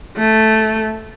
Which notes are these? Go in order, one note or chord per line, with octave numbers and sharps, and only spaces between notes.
A3